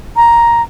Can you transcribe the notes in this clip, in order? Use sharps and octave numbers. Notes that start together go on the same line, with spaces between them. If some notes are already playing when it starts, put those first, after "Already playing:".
A#5